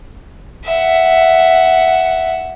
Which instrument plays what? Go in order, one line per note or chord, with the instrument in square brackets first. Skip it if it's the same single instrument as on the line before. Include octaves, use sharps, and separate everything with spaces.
[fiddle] E5 F#5